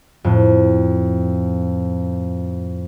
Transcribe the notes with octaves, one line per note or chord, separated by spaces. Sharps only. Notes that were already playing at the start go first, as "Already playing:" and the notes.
F2 A2